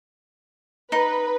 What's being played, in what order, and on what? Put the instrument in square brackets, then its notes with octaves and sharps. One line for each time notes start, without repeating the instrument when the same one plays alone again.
[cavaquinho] D#4 [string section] B4